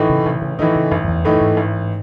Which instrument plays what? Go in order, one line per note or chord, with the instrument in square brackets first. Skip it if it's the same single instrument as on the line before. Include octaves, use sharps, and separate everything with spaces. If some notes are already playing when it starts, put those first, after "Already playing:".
Already playing: [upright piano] A2 E3 A3 D#4
[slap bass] C#3
[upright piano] A1 [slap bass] C3
[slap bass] C#3
[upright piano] A2 E3 A3 D#4 [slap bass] D#3
[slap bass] C#3
[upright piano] A1 [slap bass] F#2
[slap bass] F#2
E2
[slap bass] F#2 [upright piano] A2 E3 A3 D#4
[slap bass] G#2
[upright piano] A1